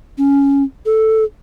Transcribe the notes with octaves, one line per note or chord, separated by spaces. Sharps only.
C#4
A4